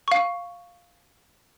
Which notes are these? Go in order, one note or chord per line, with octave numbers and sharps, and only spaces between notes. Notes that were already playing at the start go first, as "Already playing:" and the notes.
F5 C#6